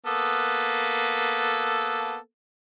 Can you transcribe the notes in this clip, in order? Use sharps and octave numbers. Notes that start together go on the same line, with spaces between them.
A#3 B3 A4